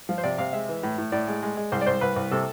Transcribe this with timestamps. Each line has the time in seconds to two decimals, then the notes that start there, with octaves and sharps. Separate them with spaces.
0.09 F3
0.18 C5
0.24 C3 D5
0.38 C3 F5
0.53 G#3 E5
0.69 E3
0.83 A2
0.98 A2
1.12 A2 D5
1.28 G#3
1.43 G#3
1.57 G#3
1.72 C2 C5
1.81 D5
1.86 C2 C5
2.01 C2 B4
2.16 C2
2.31 C3 A4